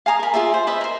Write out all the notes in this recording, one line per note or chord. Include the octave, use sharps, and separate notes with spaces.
F5 G#5 A#5 D#6
A#4 B5
F4 G#4 D5 E5
C5
B4 D#5 E5 B5
A#4 C5